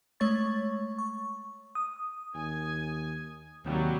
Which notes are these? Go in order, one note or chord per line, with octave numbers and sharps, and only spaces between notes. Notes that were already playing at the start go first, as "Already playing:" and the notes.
G#3 A3 C#5 C#6 A6
C#6
D#6
D#2 G#5
D#2 C3 F#3 G3